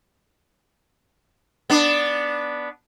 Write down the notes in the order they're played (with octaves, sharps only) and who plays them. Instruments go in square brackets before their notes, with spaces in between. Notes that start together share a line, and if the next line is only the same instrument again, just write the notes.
[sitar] B3 D4